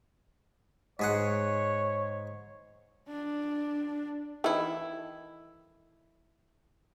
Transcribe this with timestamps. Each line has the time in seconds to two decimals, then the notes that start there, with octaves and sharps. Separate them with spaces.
0.99 G#2 G#4 C#5 F#5
3.09 D4
4.44 D#3 E3 A3 E4